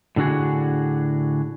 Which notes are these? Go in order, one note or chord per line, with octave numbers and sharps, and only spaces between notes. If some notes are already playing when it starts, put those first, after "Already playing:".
A2 D3 D4 F#4 G#4